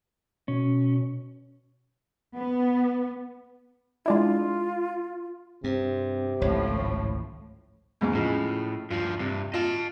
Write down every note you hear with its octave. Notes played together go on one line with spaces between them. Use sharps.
B2 C#4
B3
G#3 D4 E4 F4
G2 C3 C4
G#1 C#2 A2 F3 C#5
E2 G#2 C#3
A2 C#3 F3 G#3
G2 F3 F4
G2 C3
F4 D#5 A5